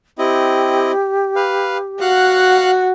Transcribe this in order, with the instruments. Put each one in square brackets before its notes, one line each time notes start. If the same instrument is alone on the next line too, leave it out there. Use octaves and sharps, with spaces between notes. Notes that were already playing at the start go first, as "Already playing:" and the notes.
[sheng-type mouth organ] C4 E4 D#5 [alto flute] G4
[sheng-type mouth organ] B4 F5
[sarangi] F#4 [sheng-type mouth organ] F5 F#5 F#6